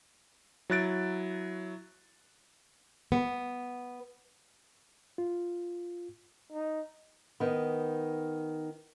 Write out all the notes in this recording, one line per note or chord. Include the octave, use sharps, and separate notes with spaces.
F#3 E4 F#6 A6 D7
B3
F4
D#4
D#3 B3